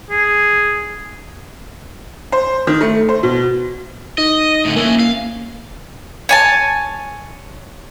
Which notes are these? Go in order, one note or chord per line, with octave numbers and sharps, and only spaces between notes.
G#4
C5
D#3
A3
C5
B2
D#4 D#5
A2 D3
A#3 C#4 E4
F5
C#5 G#5 A5